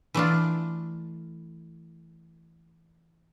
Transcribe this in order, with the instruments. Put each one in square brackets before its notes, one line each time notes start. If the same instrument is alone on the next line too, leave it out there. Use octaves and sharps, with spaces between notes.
[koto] E3 A3 D4 F4